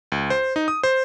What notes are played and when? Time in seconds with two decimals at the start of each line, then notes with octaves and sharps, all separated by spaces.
0.12 C#2
0.30 C5
0.56 D#4
0.68 D#6
0.83 C5